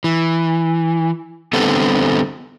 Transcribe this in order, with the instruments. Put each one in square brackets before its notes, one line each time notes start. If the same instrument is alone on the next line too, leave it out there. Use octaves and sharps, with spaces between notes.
[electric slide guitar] E3
D3 G3 B3 C4 A4 B4